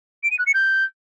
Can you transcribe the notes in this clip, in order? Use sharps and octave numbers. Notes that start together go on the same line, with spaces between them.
D7
D#7
F#6
C#7
G6